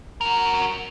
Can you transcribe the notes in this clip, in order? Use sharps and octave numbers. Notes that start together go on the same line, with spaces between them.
F#4 A#4